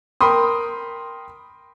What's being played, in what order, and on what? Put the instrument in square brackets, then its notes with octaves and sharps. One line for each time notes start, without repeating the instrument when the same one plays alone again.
[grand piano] A#4 G5 B5 C6 D#6